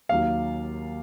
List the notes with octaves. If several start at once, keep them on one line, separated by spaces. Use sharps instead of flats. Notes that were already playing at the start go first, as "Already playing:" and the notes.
D#2 D#3 F#3 F5